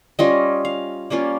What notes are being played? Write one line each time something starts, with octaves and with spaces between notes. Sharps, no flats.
G3 C#4 F4 D#5
F5
G3 A#3 C#4 F4